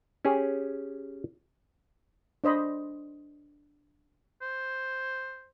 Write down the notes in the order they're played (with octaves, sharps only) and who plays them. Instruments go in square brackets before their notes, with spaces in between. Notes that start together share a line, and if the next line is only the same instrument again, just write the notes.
[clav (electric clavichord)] C#4 G4 G#4
[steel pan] D4 C5 D#5 B5
[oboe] C5